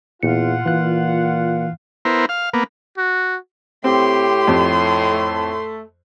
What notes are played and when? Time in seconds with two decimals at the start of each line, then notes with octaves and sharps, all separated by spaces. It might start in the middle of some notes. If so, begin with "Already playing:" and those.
0.23 E2 A#2 F4 F#5 C#7
0.66 A#2 E3 F#6
2.05 B3 E4 A#4 C5
2.29 F5
2.53 A#3 B3
2.97 F#4
3.84 A2 C4 G4 C6
4.47 F2
5.12 A3